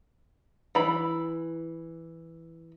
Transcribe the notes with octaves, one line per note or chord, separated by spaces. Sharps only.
E3 B5